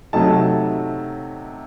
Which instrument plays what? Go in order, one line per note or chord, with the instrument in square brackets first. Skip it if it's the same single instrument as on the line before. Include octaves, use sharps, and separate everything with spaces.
[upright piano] C3 F#3 A3 D#4 A5